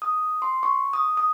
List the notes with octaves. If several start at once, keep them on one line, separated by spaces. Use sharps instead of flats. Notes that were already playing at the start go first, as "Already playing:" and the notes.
D#6
C6
C#6
D#6
D#6